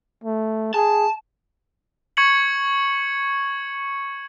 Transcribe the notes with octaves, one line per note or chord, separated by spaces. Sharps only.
A3
G#4 A5
C#6 G#6 C#7 F#7